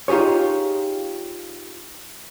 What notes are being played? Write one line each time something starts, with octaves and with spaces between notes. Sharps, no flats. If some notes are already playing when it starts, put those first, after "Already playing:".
D#4 F4 G4 G#4 C#5